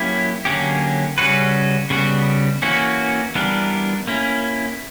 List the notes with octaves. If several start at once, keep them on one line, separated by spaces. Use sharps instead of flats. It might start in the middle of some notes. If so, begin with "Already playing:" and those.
Already playing: F#3 A#3 C#4 E4 G4
D3 F#3 A#3 C#4 G4
C#3 G3 C#4 F#4 B4
C#3 G3 B3 F#4
E3 A#3 C#4 F#4
E3 G3 B3 D4 A#4
A#3 C#4 E4